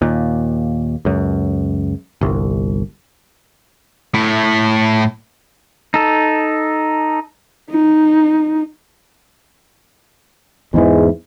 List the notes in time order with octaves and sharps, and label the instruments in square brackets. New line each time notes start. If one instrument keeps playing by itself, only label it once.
[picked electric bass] D#2 A#2
C#2 F#2
G1 C2
[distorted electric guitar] A2 E4
[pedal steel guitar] D#4 A4
[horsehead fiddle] D#4
[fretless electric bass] E2 G#2 E3 [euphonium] G#3